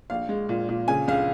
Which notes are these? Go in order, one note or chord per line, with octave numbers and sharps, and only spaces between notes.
A#1 F5
G#3
A#2
A#2
C#3 G#5
C#2 F5